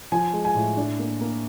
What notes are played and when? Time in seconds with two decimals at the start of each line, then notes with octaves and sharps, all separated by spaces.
0.12 F3 G#5
0.33 G#3
0.45 G#5
0.55 A2
0.77 D4
0.99 A#3
1.21 A#3